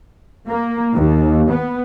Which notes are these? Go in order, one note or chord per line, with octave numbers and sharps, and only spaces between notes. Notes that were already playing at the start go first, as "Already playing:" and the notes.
A#3
D#2
B3